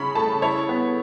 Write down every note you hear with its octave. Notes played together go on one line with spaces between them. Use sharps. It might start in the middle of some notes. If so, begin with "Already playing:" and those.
Already playing: C#3 C#4 E4 B5 C#6
A3 A5
E4 C#5
B3